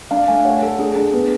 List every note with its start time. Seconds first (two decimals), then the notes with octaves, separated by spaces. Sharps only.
0.11 D4 F5
0.28 A3 G#5
0.45 C#5 F#5
0.62 A4
0.79 D4 G#4
0.96 D4 G#4
1.14 B3